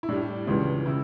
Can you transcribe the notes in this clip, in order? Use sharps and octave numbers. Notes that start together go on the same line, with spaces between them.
E4
A2 G3 D4
C#2 C#3 E3
C#3 E4